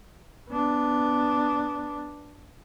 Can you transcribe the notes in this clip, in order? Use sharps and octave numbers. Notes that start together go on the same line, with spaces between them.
B3 D4